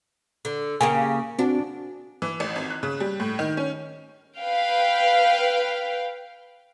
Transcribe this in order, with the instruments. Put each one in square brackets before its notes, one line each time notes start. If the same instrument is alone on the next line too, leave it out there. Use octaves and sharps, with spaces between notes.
[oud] D3
[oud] C#3 A#3 G4 [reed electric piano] G#5
[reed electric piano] C4 F#4 [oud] D4
[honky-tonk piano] E3
A1
G#1
F#6
C#3
G3
A2
D#3
C#4
[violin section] B4 F5 G5